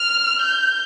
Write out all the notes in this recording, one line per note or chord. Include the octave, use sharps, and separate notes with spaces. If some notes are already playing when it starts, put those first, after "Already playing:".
Already playing: F6
G6